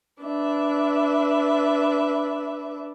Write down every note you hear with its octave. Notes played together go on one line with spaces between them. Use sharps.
D4 B4 E5